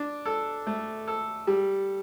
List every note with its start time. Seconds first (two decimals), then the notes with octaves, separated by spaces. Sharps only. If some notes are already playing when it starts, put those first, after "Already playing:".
Already playing: D4
0.26 A4
0.67 A3
1.08 A4
1.47 G3